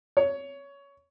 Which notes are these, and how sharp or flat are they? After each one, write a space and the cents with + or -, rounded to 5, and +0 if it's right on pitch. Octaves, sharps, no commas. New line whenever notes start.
C#5 +15